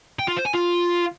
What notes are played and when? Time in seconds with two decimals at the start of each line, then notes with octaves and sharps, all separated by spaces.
0.19 G5
0.28 F4
0.36 C5
0.45 G#5
0.54 F4